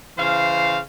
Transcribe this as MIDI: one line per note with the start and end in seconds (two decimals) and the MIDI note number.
0.18 0.79 49
0.18 0.79 52
0.18 0.79 72
0.18 0.79 77